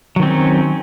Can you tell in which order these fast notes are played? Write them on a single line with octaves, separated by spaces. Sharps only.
F#3 D#3 C4 C#4